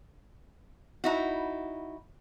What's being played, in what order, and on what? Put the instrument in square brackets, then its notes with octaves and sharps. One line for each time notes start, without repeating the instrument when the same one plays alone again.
[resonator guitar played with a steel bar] D#4 E4 F#4